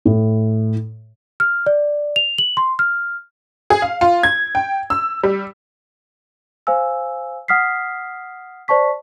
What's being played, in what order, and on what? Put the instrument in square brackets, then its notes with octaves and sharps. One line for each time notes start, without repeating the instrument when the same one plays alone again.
[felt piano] A2
[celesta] F6
D5
F7
F#7
C6
F6
[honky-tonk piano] G#4
F5
F4
G#6
G5
E6
G3
[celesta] C5 F5 G#5 E6
F#5 D#6 F6 B6 C7
C5 D5 A5 C#6 B6